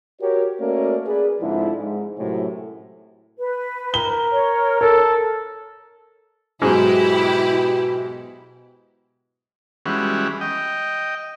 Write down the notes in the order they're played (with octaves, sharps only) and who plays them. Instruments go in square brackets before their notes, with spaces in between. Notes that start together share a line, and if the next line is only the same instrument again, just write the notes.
[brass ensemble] F#4 G4 A#4 C#5
A3 A#3 C#4 F#4 A#4 D5
G#4 B4 D5
G#2 D3 F3 C4 E4
G#2
F#2 A2 C3
[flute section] B4
[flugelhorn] A#4 [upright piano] G7
[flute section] C#5
[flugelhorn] A4 [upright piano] A#4
[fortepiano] G#2 F#3 G#3 [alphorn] B2 [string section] E4 G4
[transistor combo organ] E3 G3 G#3 B3 C#4 F#4
D#5 G5